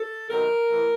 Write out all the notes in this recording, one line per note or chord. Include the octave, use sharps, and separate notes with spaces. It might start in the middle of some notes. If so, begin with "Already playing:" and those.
Already playing: A4
C3 D#3 F#3 B3 A#4
A2 E3 A3